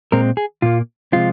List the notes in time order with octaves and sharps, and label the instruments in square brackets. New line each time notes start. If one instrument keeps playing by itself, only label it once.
[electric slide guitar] A#2 G#3 C4 A#4
G#4
A#2 A#3 F4
C3 F3 G#3 C4 F4